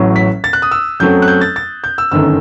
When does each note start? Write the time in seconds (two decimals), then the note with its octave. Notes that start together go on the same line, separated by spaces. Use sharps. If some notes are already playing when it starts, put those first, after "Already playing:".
Already playing: A1 A2 F#3
0.16 B6
0.44 A6
0.53 F#6
0.62 D#6
0.71 E6
1.00 F#2 F#3 A3 C4 G6
1.22 F#6
1.28 G6
1.41 A6
1.56 A6
1.84 G6
1.98 E6
2.11 G1 F#2 D#3 A3 E6